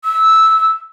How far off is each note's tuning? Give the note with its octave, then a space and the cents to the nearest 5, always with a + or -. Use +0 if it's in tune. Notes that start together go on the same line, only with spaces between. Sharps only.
E6 -15